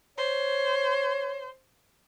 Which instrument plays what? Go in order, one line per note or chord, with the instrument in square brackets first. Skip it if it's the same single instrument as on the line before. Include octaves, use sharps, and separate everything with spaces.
[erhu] C5 [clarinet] C#5